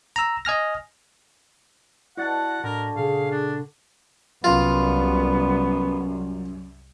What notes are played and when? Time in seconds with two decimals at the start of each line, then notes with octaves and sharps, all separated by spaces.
0.16 A#5 E6
0.45 D#5 G#5 F6 A#6
2.17 E4 F#4 D5 F#5 A5 A6
2.64 A2 D3 A#4
2.96 A#2 C#3 G#4 F5
3.31 D4
4.44 C2 F#2 G3 B3 F4